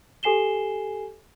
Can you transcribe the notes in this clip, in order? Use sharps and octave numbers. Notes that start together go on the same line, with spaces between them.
G4 A4 G#5 C7 E7 G7